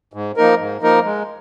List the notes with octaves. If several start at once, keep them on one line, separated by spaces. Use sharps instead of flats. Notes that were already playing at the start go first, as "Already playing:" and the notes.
G#2
F3 A#3 D#4 A#4
G#2
F3 A#3 D#4 A#4
G#3